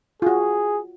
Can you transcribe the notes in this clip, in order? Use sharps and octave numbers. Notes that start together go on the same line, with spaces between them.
F4 F#4 G#4